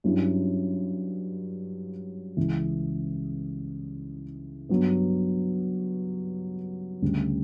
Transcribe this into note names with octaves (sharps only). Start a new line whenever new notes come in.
G2 F#3 C#4 E4
C#2 C#3 E3
G2 F#3 B3
D2 C#3 G3